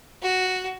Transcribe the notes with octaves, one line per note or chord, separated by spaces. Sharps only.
F#4